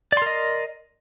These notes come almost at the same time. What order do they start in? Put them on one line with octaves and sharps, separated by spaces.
D5 C6 A#4 D#5